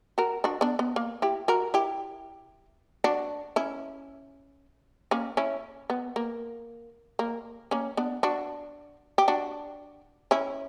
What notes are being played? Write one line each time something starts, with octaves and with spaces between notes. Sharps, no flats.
F#4 A#4
D4 F#4
B3 D4
B3
A#3
E4 G4
F#4 A#4
E4 G4
D4 F#4
C#4 E4
A#3 C#4
C#4 E4
B3
A#3
A#3
A#3 C#4
B3 D4
D4 F#4
G4
D4 F#4
C#4 E4